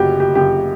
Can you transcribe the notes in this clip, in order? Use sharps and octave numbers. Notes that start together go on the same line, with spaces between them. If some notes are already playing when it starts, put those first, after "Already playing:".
Already playing: F#1 F#2 C#3 F#4 G4
G4
F#1 F#2 C#3 G4